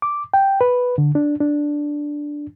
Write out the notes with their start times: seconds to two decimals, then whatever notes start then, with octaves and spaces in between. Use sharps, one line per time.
0.02 D6
0.34 G5
0.61 B4
0.98 D3
1.15 D4
1.40 D4